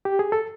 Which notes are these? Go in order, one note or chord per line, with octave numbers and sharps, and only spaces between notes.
G4
G#4
A4